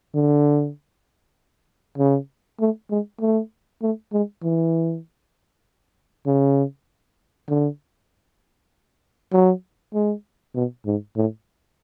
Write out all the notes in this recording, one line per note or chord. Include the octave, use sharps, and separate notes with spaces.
D3
C#3
A3
G#3
A3
A3
G#3
E3
C#3
D3
F#3
G#3
B2
G#2
A2